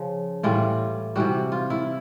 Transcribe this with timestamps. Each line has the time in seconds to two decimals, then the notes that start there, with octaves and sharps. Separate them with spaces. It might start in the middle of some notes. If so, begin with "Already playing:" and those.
Already playing: C#3 F3
0.43 A2 E3 G3 F4
1.16 C3 E3 G3 F#4
1.52 F4
1.70 E4